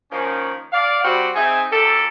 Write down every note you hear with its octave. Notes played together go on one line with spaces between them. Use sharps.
D#3 F3 A#3 C#4
D5 F5
G3 C4 F#4 G4 F#5
C4 D#4 G#4 E5 G#5
F#2 G4 A4